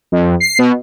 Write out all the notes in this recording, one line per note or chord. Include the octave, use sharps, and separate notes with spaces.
F2
C7
B2